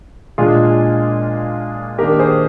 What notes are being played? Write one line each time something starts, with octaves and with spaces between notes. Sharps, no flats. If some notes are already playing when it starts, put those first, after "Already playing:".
A#2 G#3 D4 F4 G#4
D#3 A#3 D4 G4 A#4
G#4 C5